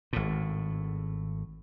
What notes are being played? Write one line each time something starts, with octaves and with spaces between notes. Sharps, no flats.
G#1 A2